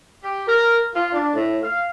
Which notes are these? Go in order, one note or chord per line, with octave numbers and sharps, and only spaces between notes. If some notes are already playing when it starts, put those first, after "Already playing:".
G4
A#4
F4
D4
A2
F5